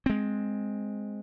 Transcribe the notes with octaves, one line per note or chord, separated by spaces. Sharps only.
G#3 C4